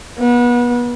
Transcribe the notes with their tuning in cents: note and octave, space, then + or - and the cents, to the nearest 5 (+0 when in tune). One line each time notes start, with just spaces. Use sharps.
B3 -30